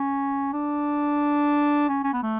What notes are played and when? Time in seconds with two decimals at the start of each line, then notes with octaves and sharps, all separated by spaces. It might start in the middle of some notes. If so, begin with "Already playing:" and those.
Already playing: C#4
0.53 D4
1.89 C#4
2.04 C#4
2.13 B3
2.23 A3